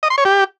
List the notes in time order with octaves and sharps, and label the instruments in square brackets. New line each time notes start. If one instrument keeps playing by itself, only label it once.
[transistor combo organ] D#5
C6
C#5
G4